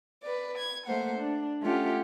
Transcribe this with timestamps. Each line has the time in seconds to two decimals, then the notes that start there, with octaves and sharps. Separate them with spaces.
0.23 B4 D5
0.58 G#6
0.87 A3 A#3 C5 F#5
1.19 D4
1.62 A3 C#4 F4 G4 F#5